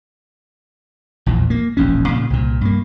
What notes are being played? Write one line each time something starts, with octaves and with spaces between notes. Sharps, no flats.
A#1 E2 A#2
A#3
E1 A#1 D#2 C#4
A#2 C#3
C2 A#2
G2 A#3